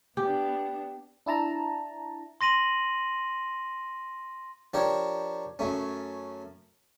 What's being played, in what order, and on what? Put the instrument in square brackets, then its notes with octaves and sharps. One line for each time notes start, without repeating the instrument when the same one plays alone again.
[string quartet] B3 D4 [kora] G4
[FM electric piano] D4 E4 A5 A#5
[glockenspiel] C6 A#6 D#7 F#7
[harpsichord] F3 D4 G4 A#4 C#5
F#2 A3 C#4